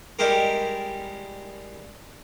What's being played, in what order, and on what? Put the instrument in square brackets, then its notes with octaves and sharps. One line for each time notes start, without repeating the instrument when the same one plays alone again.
[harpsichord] G3 G#3 E4 G4 A#4